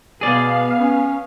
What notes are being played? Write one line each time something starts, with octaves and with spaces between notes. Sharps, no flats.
B2 B3 G#4 D5 F5
C#4